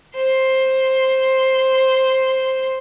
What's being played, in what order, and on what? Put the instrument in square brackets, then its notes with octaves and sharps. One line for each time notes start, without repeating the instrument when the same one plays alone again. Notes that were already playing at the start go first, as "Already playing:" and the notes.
[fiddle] C5 C6